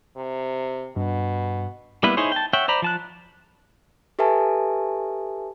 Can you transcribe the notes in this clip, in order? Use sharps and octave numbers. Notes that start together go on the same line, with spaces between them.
C3
G2 B2
G3 A#3 B3 E4 B4
D#4 E4 G#4 C5 C#5
G5 A5
C#5 E5 F#5 G5
C5 D5 A#5 B5
F3 A5 F#6
G4 A4 B4 E5 G#5 A5